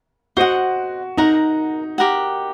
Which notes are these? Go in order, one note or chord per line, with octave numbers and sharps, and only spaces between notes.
F#4 C5 D#5 F#5
D#4 A#4 F#5 A#5
G4 A#4 F#5